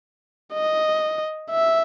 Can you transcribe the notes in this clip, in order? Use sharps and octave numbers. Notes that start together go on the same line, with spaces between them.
D#5
E5